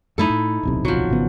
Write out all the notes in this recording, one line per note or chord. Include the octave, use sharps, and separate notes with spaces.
F#2 A3 D#4 E4 A4
A2
D1 B1 C3
F3 F#3
G#1 C#3 B3